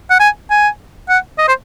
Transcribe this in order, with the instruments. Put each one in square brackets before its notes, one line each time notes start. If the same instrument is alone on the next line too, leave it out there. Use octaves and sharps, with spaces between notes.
[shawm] F#5
G#5
G#5
F#5
D#5
C5